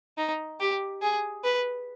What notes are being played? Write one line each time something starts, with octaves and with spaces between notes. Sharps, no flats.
D#4
G4
G#4
B4